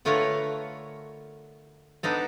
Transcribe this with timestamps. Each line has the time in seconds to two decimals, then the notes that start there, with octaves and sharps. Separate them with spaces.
0.05 D3 A3 F4 A#4 B4 C#5
2.03 B3 D4 D#4 A4